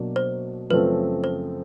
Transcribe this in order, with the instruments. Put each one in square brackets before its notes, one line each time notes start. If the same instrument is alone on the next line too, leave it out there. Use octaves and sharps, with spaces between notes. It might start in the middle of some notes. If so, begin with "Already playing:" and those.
Already playing: [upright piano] B2 F#3 A#3 D4 F#4
[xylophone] C5
[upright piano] F#2 C#3 F3 A3 C4 [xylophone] B4
[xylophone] C5